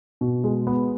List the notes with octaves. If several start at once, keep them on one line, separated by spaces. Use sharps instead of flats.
B2
G#3
B3